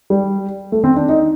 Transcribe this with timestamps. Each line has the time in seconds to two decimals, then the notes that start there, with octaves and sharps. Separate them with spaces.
0.10 G3
0.72 A3
0.84 C4
0.97 D4
1.09 D#4